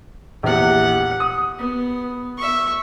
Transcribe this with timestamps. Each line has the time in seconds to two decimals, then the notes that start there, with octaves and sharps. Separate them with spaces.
0.43 A#1 E2 G4 F#5
1.20 D#6
1.59 B3
2.37 E5 C#6